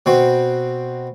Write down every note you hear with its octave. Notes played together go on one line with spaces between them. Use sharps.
B2 C4 F#4